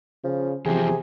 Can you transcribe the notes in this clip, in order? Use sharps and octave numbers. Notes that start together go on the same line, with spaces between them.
C#3 F3
E2 C3 F3 G#4